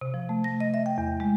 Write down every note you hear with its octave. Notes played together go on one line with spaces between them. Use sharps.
C3
F3
A3
A#6
D#5
E5
G5
E2
G#3